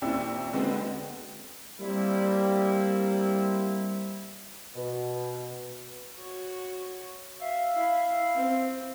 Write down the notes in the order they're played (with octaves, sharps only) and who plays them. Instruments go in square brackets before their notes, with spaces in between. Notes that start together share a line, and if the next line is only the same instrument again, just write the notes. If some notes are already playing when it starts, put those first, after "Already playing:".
[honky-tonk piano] D#2 A#2 C4 E4 D5 E6
D3 G#3 B3 C4 F#4
[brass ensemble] G3 A#3 C4 E4
[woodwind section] B2
[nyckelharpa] F#4 C#5
[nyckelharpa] E5 [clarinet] F5
[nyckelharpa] E4 E5
C4